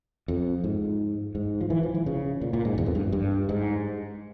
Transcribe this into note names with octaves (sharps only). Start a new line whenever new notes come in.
F2
G#2
G#2
F3
E3
F3
E3
C#3
A#2
A#2
G#2
E2
F2
G2
G2
G#2